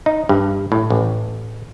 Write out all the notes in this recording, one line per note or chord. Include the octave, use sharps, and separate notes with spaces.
D#4
G2
A2
A1